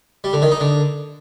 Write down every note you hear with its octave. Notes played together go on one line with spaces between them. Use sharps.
G3
D3
D#3
D#4
D3